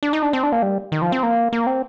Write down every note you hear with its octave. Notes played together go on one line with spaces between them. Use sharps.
D4
D#4
D4
C4
D4
A#3
G3
D#3
F3
C4
A#3
A#3
C4